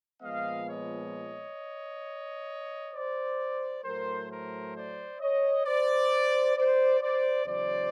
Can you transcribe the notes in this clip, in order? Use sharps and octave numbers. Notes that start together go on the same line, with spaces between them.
A#2 F3 G#3 B3 D#5 F5
C#5 D#5
C5 D5
A2 F#3 A3 A#4 C5
A#4 C5
C5 D5
C#5 D#5
C5 D5
C5 D5
C5 D5
E2 C#3 F#3 C5 D5